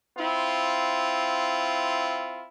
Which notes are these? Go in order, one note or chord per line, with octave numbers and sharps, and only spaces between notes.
C4 E4 F4